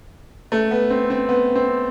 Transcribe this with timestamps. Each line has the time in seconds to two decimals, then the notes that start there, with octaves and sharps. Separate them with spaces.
0.52 A3
0.71 B3
0.90 C4
1.10 C4
1.29 B3
1.55 C4